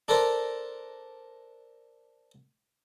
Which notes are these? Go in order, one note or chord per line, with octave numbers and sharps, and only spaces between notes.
D4 A4 A#4 C5 D5